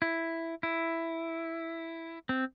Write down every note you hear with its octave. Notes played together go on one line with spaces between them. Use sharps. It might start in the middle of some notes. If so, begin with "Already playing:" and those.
E4
E4
C4